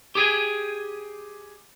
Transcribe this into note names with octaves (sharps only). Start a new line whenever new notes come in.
G4 G#4 G#5